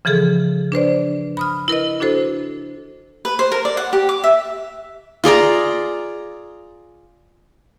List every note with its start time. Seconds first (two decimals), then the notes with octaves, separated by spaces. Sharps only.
0.05 C#3 E3 F3 G#4 A4
0.72 D4 B4 C5 D5
1.37 B5 D#6 F6
1.68 E4 A#4 B4 D#5
2.00 D4 E4 F#4 A4 C5
3.25 B4
3.39 C5
3.52 A#4
3.65 D5
3.77 F#5
3.93 G4
4.09 D6
4.24 E5
5.24 F4 G#4 D5 A#5